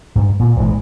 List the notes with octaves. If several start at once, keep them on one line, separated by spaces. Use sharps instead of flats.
G2
A#2
D#1 G#1 E3 G#3